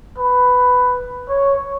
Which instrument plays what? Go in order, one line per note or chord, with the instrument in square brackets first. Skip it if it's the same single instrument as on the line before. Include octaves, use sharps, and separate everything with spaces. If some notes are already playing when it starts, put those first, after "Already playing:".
[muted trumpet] B4
C#5